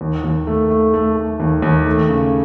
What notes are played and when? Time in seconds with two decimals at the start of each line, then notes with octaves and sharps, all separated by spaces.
0.01 D#2
0.24 D#2
0.47 A3
0.70 A3
0.94 A3
1.17 A3
1.40 D#2
1.62 D#2
1.86 A3
2.09 C#3